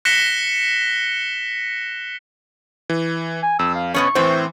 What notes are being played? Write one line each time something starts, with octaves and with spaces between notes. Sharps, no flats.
F#6 A#6 B6 C#7 E7 G7
E3
G#5
F2 E6
F5
B2 B3 C#4 C#6
A2 E3 C4 C5